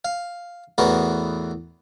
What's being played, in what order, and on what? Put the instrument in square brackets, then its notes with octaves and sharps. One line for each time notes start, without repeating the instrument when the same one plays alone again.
[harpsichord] F5
E2 A2 B3 F#4 A#4